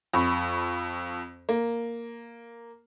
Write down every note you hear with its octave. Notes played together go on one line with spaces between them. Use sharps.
F2 B5 C#6
A#3